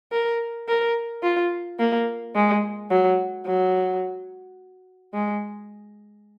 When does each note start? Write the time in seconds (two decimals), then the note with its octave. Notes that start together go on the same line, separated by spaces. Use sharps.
0.12 A#4
0.69 A#4
1.23 F4
1.79 A#3
2.35 G#3
2.91 F#3
3.47 F#3
5.14 G#3